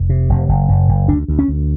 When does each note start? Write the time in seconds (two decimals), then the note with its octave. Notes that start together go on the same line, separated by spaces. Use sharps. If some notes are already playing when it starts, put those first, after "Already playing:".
Already playing: F1
0.09 C3
0.29 F1
0.49 F#1
0.68 F#1
0.89 F#1
1.08 D2 D4
1.28 D2
1.39 C#4
1.48 D2